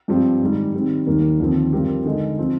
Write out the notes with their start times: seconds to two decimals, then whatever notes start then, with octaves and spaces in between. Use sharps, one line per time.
0.08 G2 F3 C4 G4
0.41 G#2 D#3 G3
0.74 D#3 G3 C4
1.06 D#2 D#3 G3 A#3
1.40 D#2 D3 F3 C4
1.72 G2 F3 C4 G4 A#4
2.05 D3 G#3 D#4
2.38 F3 C4